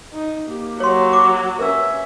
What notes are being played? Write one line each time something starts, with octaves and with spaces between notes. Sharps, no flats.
D#4
A#3 G4
F#3 C#5 C6
D6
C#4 A#4 B4 E5 E6